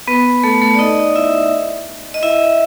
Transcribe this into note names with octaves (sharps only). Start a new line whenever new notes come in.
B3 B4
A3 A4
A3 A4
D5
D#4 D#5
E4 E5
D#5
E4 E5